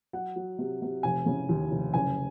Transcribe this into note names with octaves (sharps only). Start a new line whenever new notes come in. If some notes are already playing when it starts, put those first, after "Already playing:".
F#3 F#5
F#3
C3
C3
F1 G#5
C#3
D#2
F1
F#1 G#5